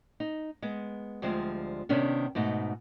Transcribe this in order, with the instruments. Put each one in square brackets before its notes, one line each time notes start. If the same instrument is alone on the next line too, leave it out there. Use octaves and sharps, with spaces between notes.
[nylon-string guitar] D#4
G#3 B3
D2 F3 G3 G#3 C4
C3 D#3 B3 C#4 D4
G#2 B2 A3 D#4